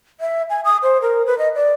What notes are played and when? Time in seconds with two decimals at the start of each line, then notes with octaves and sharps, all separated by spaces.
0.20 E5
0.50 G#5
0.65 D#6
0.83 C5
1.02 A#4
1.27 B4
1.38 D#5
1.55 D5